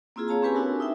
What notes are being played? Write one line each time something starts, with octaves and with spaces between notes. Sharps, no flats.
A#3 C4 E4 F4 G#4
G#4 C#5 F5 A5 A#5
C4 C#4 G4 B4 G#5 B5
D4 E4 F#4 A4 A#4
D#4 E4 E5 G5